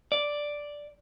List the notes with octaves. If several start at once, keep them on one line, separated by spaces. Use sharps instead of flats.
D5